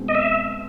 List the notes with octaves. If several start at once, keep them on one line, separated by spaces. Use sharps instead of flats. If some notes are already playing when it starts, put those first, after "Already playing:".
Already playing: B2 G#3 C4
D#5
E5